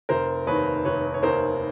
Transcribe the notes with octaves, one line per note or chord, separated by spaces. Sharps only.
F1 A#4 C5
D#2 D#3 B4 C#5
F1 B4 C#5
C#5
D#2 D#3 A#4 C5